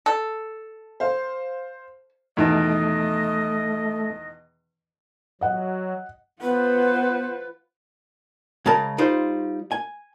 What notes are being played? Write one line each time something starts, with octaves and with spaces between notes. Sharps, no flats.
A4
C5 F5
E2 B2 D#3 A3 D#5
F#3 D#5 F#5
B3 F4 B4 C5 F#5
C#3 G#3 A#4 A5
G3 D#4 F4 C5
G#5